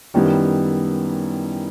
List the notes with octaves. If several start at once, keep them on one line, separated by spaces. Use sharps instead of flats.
F#2 D#3 G3 B3 E4